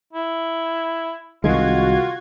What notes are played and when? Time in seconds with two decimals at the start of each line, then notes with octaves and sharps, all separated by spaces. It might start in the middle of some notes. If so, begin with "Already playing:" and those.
0.13 E4
1.44 C2 D#3 G#3 F4 F#4 G#6